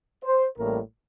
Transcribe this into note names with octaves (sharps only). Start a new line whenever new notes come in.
C5
A1 A2 G3 A#3 A#4